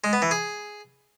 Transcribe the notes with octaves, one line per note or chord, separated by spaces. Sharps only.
G#3
B3
E3
G#4